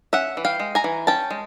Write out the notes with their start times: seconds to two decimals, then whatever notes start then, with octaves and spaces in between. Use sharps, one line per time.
0.13 C#4 E5 F#5
0.37 E3
0.45 F5 G5
0.60 G#3
0.75 G#5 A#5
0.84 E3
1.07 C#4 G5 A5
1.30 G#3